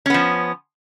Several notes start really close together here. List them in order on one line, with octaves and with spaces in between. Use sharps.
C#4 B3 F3